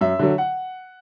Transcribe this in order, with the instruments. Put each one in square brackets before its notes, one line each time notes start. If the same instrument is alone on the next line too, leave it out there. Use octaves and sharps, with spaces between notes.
[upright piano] F#2 E5
D3 F#3
F#5